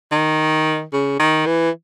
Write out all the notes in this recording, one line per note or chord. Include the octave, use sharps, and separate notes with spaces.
D#3
C#3
D#3
E3